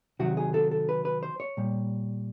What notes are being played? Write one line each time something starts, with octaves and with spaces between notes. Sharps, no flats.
C3 D#3 F#3 F#4
G#4
A4
A4
B4
B4
C5
C#5
A#2 G3